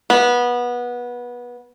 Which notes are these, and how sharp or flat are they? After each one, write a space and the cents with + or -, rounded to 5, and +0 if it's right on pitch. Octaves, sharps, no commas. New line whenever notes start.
B3 -20